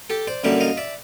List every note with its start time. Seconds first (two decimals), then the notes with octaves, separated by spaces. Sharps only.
0.10 G4 A4
0.27 C5 D5
0.44 F#2 D3 G3 A#3 D5 E5
0.60 D#5 F5
0.77 D5 E5